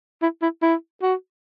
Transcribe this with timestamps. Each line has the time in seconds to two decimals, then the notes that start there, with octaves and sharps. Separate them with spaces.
0.22 E4
0.42 E4
0.62 E4
1.02 F#4